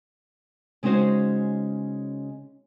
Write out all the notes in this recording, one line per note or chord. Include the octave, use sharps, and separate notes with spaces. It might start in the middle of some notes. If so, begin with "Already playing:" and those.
C#3 G#3 C#4 D#4 F#4 C5